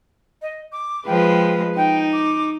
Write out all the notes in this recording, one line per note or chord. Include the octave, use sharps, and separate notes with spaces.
D#5
D6
F3 G#3 B4 G5
D#4 G5
D6